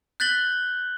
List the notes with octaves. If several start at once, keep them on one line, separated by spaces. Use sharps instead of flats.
F#6 G6 A6 B6 F#7 G7